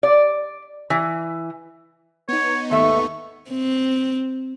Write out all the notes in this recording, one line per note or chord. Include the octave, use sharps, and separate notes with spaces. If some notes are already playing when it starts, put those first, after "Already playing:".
D5
E3
B3 D#4 C#5
D#2 G#2 D#3 A3 E5 C#6
C4